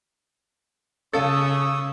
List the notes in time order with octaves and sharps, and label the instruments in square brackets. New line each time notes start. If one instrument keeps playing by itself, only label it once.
[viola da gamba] C#3 [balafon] C#4 F5 [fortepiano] A4 [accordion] C#6 D#6 E6